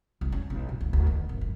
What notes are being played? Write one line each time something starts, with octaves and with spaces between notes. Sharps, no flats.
C2
C#4
B1
G#2
D2
D2
D#3
G#1
F2